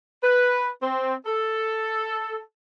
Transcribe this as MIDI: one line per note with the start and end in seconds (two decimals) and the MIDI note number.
0.23 0.69 71
0.83 1.14 60
1.26 2.40 69